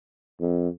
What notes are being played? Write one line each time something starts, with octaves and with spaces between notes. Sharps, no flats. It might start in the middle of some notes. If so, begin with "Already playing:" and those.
F2